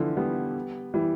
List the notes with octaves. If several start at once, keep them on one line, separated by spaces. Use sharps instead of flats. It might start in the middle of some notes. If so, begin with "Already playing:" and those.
Already playing: D3 E3 F3
G3 B3
E3 G3